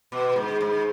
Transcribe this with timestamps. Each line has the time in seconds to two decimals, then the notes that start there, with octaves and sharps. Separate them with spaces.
0.12 B2
0.36 G#2
0.61 G#2